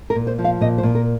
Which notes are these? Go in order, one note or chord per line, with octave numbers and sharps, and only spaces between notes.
A#4
A#2
C5
F3
F5
A#2 D#5
C5
A#2
A#4